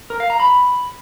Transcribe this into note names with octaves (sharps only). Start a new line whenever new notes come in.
A#4
F5
A#5
B5